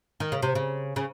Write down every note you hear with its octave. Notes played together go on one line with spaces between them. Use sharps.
D#3
C#3
C3
C#3
C#3